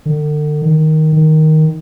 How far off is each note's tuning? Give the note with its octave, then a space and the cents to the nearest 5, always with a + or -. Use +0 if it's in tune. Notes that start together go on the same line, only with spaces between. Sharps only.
D3 +40
D#3 +5
D#3 +5